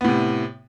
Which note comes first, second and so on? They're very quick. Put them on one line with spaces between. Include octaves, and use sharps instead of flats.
B3 A2 C3